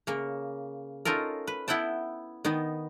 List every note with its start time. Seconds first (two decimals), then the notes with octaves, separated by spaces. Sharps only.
0.07 C#3 A#3
1.05 C#4 D#4 F4 A4 A#4
1.47 B4
1.68 B3 E4 F#5 G5 A5
2.45 D#3 B3 D#4